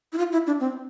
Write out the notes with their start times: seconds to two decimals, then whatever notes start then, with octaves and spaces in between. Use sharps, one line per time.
0.13 E4
0.18 F4
0.32 E4
0.47 D4
0.60 C4